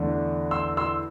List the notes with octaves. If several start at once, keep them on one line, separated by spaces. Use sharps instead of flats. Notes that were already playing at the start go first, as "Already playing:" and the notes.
Already playing: E2 D3 A3 D4
C6 E6
C6 E6